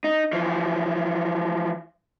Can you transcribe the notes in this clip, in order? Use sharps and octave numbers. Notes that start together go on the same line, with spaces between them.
D#4
E3 F3